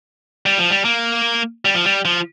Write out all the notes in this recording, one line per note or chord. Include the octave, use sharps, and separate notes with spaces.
G3
F3
G3
A#3
G3
F3
G3
F3